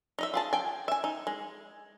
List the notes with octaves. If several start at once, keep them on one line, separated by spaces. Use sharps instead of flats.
D#4 D#5 E5
F4 G#4 A5
G5 G#5
E5 G#5
D#4
G#3